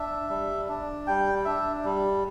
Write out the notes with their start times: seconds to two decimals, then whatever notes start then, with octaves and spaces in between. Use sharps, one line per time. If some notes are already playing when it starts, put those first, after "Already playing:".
Already playing: D4 E5
0.29 G3
0.69 D4
1.07 G3 G5
1.45 D4 E5
1.85 G3